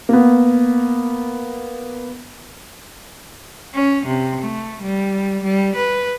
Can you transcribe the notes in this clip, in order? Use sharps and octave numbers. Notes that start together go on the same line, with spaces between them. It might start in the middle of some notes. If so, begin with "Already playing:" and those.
A#3 B3
C#4
C3
A3
G3
G3
B4